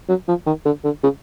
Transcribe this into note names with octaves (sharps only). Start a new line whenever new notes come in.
F#3
F3
D#3
D3
D3
C#3